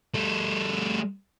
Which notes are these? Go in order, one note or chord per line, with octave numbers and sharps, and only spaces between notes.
G3 A3